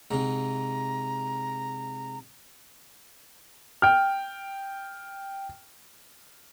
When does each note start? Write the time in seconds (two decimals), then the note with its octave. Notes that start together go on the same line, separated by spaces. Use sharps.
0.11 G#2 C3 A#5
3.82 G5 F6